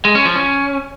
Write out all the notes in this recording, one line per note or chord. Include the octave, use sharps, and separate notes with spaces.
G#3
C#4
F3
C#4